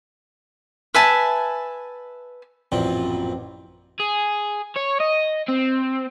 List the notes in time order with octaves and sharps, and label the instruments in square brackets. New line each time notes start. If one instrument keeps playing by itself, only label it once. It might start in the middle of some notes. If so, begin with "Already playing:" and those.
[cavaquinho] B4 E5 G#5 A5
[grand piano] A1 D5 G5 [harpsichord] F#2 A#2 F3 [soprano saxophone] C4
[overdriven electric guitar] G#4
C#5
D#5
C4